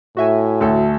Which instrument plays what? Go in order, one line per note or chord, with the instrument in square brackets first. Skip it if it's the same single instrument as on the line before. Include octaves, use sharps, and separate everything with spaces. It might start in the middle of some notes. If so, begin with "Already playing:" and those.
[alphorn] A2 [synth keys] F#4 E5 G#5
[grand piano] D2 A4